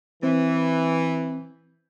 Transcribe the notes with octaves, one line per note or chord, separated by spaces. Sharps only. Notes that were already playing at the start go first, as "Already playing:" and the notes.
E3 C4